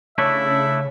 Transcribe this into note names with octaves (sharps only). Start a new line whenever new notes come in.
C#3 A3 D4 E4 C#5 E5